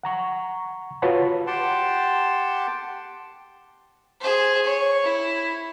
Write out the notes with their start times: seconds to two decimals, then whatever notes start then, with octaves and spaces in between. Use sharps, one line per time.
0.03 F#5 A#5 C#6
1.02 F4 F#4 B4 C#5 A5 B5
1.47 G4 F#5 G5 A5 C6
4.20 G#4 C5
4.63 C#5
5.04 E4